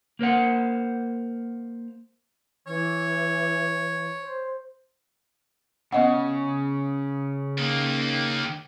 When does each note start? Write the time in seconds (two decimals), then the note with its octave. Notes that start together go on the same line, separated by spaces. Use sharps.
0.19 A#3 A#4 C5 F#5
2.67 E3 C#5
4.22 C5
5.92 C#3 B3 D#5 F#5
7.58 D#3 A#3